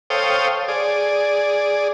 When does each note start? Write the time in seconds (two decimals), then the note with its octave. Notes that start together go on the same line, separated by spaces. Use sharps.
0.10 A4 C5 C#5 F5 G5 D#6
0.68 G#4 D5